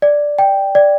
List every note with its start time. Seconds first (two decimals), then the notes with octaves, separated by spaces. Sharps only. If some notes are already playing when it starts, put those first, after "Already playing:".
0.02 D5
0.39 G5
0.75 D5